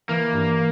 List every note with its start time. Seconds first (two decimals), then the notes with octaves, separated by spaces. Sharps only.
0.09 E3 A#3
0.33 G2